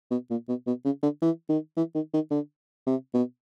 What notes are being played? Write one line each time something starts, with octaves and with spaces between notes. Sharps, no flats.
B2
A#2
B2
B2
C#3
D3
E3
D#3
E3
D#3
D#3
D3
C3
B2